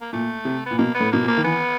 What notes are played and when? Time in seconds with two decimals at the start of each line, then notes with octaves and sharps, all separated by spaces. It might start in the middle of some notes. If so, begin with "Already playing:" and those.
0.01 A#3
0.13 A#2 A3
0.45 C3
0.66 A#2 B3
0.78 B2 A#3
0.95 B3
1.00 A2
1.12 B2 A#3
1.23 A#2
1.28 A#3
1.37 D#3
1.44 E3 B3